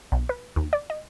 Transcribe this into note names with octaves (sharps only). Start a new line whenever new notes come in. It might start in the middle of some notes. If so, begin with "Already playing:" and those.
B1
B4
D#2
D5
D#5